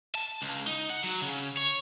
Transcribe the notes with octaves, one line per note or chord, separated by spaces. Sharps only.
A5
C#2
D#4
F#5
F#3
C#3
C#5